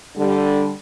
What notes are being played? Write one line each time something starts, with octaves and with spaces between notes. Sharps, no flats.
D3 G3